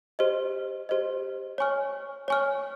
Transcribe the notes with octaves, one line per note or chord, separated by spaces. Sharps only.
G4 C5 D#5
G4 C5 D#5
C#5 G#5 C#6 F6
C#5 G#5 C#6 F6